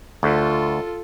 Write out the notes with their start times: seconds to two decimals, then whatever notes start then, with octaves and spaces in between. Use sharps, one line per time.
0.23 D2 F4 A4